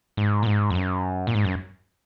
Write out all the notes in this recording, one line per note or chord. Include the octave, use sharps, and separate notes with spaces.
G#2
A#2
G#2
F2
F#2
A#2
G#2
F#2